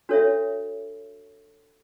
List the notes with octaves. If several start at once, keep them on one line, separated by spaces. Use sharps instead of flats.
D4 F#4 A4 C#5 E5